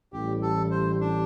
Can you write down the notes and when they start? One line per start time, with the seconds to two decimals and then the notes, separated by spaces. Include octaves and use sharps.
0.13 A1 A2 G3 G4
0.42 A4
0.71 C5
1.01 D4